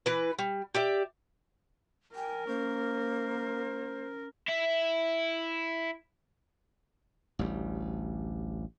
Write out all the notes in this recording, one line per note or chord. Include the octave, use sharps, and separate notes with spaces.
E3 B4
G3
G4 D5 E5
A#4 G5 G#5
A#3 C#4 C5
E4 E5
A1 D2 G3